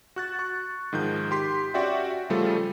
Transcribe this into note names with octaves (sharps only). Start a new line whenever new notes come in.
F#4 F#6 A6
C#6
G#2 D#3 F3 G6
G4 C6 B6
C#4 F#4 G4 D5 E5 G5
C#3 F3 G3 A3 F4 A4